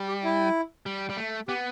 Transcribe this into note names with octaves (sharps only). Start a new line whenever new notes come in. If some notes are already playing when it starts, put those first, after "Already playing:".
Already playing: G3
G4
E4
G3
G3
A3
B3 G4